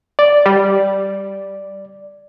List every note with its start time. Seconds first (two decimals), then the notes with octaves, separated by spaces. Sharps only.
0.19 D5
0.46 G3